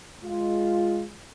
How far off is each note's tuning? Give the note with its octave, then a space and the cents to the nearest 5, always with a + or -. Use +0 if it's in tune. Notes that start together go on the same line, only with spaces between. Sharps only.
G#3 +0 F4 +0